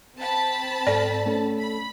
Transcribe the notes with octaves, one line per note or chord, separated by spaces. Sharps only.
C4 A5 B5
G#2 A4 D5
A3 C#4 A4
B5